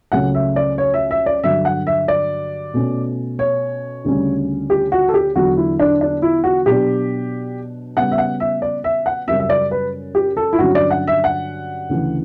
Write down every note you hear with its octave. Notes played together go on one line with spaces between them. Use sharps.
C#2 C#3 F#3 A3 C#4 F#5
E5
D5
C#5
E5
E5
D5
G2 D3 F#3 E5
F#5
E5
D5
B2 A3 C#4
C#5
D2 C#3 G3 C#4
G4
F#4
A4
G4
E2 D3 F#3 F#4
E4
D4
D4
E4
F#4
B2 F#3 B3 D4 G4
C#3 G3 B3 F#5
E5
F#5
E5
D5
E5
F#5
F#2 C#3 G3 C#4 E5
E5
D5
B4
G4
A4
E4
G2 D3 F#3 C#4 F#4
D5
F#5
E5
F#5
D2 C#3 E3